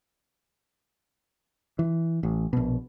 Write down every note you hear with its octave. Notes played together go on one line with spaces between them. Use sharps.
E3
A1
A#1 B2